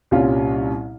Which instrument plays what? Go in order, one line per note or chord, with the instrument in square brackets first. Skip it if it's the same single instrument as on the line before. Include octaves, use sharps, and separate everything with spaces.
[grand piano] C2 A#2 G3 C#4 F4